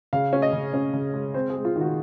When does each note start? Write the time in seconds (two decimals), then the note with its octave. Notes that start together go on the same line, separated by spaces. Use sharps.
0.13 C#3 F5
0.33 C#4
0.42 D#5
0.53 C#3
0.74 C#4
0.93 C#3
1.14 G#3
1.34 C4 C5
1.50 G#4
1.55 G#3
1.65 F4
1.76 D#3
1.81 F#4